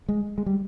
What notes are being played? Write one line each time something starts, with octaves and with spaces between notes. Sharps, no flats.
G#3
G#3
G3